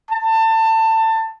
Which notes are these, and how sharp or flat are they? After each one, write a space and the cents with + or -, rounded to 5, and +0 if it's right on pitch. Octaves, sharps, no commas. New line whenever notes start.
A5 +25